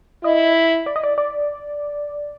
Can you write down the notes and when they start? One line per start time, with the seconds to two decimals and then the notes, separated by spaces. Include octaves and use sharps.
0.23 E4 D#5
0.86 D5
0.96 D#5
1.04 D5
1.18 D5